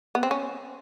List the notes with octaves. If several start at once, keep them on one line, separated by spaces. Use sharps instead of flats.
B3
C4
C#4